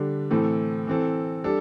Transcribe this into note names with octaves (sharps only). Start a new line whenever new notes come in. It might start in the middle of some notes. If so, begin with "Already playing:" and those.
Already playing: D3 G3 D4
A2 E3 C4 A4
E3 C4 A4
G3 D4 A4